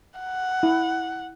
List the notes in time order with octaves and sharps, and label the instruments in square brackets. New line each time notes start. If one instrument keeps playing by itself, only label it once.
[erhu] F#5
[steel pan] E4